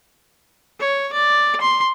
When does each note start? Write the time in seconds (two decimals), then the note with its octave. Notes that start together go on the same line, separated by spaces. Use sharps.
0.80 C#5
1.13 D5
1.61 C6